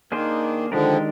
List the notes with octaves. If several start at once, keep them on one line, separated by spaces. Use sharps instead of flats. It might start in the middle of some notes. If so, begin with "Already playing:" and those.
D#3 A#3 D4 G#4 C5
D3 D#3 F3 G#3 D4 G4 A#4